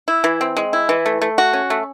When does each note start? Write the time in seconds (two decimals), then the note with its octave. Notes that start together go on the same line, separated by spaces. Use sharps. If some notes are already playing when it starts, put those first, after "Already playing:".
0.08 E4
0.24 E3
0.41 C4
0.57 G#3
0.73 E4
0.89 E3
1.06 A3
1.22 A3
1.38 F#4
1.53 C#4
1.70 A3